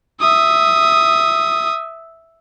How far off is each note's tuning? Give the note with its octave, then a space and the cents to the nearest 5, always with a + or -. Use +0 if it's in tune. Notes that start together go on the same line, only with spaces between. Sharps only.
E5 +0 D#6 +5